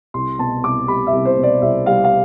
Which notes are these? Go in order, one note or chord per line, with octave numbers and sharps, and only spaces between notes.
C2 C6
B2 A5
C2 D6
G3 B5
E5
C2
C5
B2
D5
C2 E5
G3 F5
F5